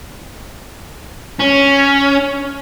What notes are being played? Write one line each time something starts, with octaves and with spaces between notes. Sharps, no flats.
C#4